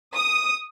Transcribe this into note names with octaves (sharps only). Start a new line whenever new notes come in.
D#6